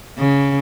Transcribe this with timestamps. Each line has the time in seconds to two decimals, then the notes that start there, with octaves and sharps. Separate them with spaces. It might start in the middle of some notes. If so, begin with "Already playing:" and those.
0.18 C#3